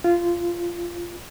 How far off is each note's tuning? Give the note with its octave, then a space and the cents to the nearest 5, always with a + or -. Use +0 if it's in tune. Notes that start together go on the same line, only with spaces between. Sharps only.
F4 -15